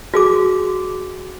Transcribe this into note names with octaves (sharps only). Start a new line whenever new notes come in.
F#4 G#4 D6